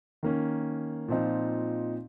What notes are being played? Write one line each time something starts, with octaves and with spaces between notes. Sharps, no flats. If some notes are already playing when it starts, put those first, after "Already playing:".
D#3 A#3 C#4
A#2 F3 C4 D#4